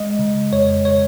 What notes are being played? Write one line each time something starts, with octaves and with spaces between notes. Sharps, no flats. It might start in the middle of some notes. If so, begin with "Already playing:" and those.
Already playing: G#3 D#5
C#3
F2 C#5
C#5